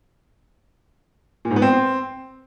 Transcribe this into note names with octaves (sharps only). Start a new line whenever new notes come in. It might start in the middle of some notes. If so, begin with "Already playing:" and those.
A#2
G#2
B3
C4